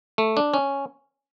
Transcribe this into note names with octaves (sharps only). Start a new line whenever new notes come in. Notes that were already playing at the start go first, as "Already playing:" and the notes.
A3
D4
C#4